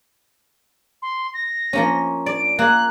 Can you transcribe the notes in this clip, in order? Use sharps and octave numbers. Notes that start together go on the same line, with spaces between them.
C6
A#6
F3 A#3 C#4
D5 D7
A#3 G#4 F#6